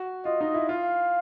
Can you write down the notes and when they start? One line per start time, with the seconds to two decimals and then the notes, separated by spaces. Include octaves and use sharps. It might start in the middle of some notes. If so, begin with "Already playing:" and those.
Already playing: F#4
0.25 F4 D#5
0.41 D#4
0.54 E4
0.69 F4 F5